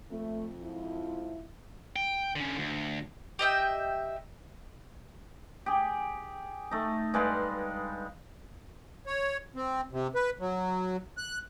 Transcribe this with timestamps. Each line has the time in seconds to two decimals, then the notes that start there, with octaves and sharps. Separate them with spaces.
0.11 F2 A3
0.63 G#2 F3 E4
1.96 G5
2.36 D3 C#4
2.58 D2
3.39 G4 D#5 E5 G5
5.66 G4 G#4
6.71 A3 D#4
7.14 G2 G#3 B4 F5
9.07 C#5
9.56 C4
9.92 C3
10.15 B4
10.39 F#3
11.17 F#6